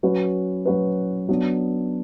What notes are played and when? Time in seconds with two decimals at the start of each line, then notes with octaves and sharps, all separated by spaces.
0.03 F#3 C#4 F#4 B4
0.65 F#3 C#4 F#4 B4
1.29 F#3 B3 D4